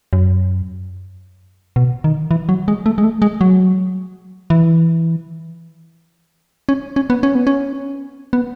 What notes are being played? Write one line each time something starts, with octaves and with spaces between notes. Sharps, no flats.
F#2
B2
D#3
E3
F#3
G#3
A3
G#3
A3
G#3
F#3
E3
C#4
C#4
B3
C#4
B3
C#4
B3